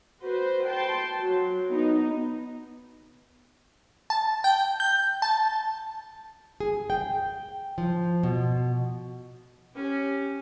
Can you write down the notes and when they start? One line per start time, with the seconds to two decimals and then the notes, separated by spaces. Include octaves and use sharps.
0.22 F#4 B4 C5
0.67 G5 A5 C6
1.21 F#3
1.68 B3 D#4
4.10 A5
4.44 G5
4.80 G6
5.22 A5
6.60 G#4
6.90 G5
7.78 F3
8.23 B2
9.74 C#4 G4